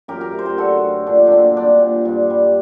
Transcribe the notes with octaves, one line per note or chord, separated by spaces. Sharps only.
F#2 G4 A#4
G4 A#4
A3
C5
G4 A#4
D3 F#4 A4
F#2
A#2 D4
A#3 C4 D4
G3 D4
A#2
G2
G3